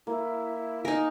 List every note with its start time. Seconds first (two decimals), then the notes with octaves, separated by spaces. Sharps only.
0.07 A#3 E4
0.85 D#4 A#4 G#5